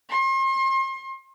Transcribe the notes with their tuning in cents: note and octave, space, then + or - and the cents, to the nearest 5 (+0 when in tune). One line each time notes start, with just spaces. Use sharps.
C6 +40